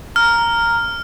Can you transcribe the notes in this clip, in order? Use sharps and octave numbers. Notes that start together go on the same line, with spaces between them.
A#5 F6